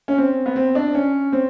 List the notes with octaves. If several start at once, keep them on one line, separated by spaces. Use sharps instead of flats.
C#4
C4
B3
C4
D4
C#4
C4